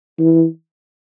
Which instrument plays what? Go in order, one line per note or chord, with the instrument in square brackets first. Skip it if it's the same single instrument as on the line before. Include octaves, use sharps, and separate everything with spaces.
[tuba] E3